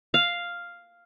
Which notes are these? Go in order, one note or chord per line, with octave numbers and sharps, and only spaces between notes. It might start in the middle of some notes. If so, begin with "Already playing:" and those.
F5